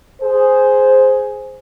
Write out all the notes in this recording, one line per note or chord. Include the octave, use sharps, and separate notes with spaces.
G#4 C5